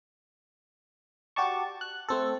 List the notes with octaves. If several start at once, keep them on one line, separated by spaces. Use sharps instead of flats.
F#4 G4 D5 A5 C#6
F#6
A3 C4 A4